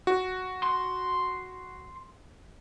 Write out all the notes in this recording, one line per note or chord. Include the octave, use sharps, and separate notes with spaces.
F#4
C6